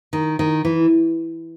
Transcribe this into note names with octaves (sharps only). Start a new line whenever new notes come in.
D#3
D#3
E3